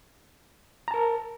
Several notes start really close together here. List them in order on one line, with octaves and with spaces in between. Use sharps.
A#5 A5 A#4